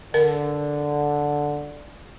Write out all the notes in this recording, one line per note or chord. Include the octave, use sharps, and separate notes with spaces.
D3 A#4